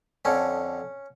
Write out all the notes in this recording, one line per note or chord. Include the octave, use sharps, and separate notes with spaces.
F2 D3 C#4